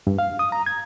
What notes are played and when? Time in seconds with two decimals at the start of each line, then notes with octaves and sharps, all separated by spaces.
0.07 G2
0.19 F5
0.39 D#6
0.52 A#5
0.66 G#6